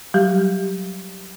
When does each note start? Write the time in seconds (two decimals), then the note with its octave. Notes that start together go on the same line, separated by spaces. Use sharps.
0.14 F#3 G3 G4